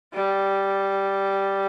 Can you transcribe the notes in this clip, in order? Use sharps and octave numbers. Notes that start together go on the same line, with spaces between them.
G3